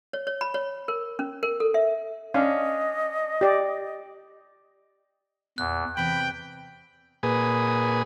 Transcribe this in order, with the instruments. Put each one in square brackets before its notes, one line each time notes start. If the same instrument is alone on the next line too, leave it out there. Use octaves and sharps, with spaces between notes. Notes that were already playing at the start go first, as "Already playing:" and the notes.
[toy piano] C#5
C#5
B5
C#5
A#4
C#4
A#4
A4
E5
[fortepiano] C#4 D4 [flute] D#5 [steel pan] F5
[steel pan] G4 D5
[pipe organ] E2 [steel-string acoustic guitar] A#2 [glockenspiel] F#6
[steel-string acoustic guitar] E2 C3 [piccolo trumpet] G5 [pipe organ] B5
[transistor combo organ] A#2 G#4 B4 D#6